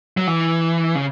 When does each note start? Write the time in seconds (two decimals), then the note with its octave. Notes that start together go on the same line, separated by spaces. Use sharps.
0.17 F#3
0.27 E3
0.95 C#3